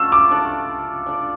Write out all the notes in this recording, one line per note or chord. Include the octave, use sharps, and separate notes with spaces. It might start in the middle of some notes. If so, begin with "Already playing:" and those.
Already playing: A3 D4 F4 E6
D6
D4 A4 D5
D4 A4 D5